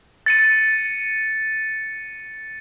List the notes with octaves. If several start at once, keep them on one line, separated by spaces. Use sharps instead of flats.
A6 C#7 D#7